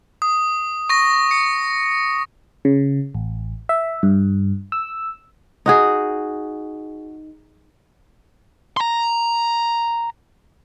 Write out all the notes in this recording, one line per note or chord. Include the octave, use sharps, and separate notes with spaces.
D#6
C#6 A#6
C#7
C#3
A1
E5
G2
E6
D#4 F#4 G#4
A#5 C6